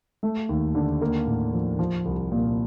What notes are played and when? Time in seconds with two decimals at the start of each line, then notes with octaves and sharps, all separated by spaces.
0.23 A3
0.49 D#2
0.75 D3
1.01 A#3
1.27 A2
1.53 F3
1.79 F3
2.05 C2
2.32 A#2